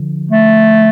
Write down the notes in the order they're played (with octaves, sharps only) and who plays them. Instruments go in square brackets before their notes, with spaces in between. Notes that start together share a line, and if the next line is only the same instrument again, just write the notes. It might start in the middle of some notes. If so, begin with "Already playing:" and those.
Already playing: [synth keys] D3 F3
[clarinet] A3